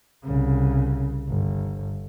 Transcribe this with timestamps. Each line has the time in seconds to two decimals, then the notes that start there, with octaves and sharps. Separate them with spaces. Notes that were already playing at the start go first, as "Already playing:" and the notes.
0.24 C2 C#3
1.28 G1